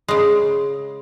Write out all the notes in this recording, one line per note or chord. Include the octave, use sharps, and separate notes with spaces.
C#3 G#3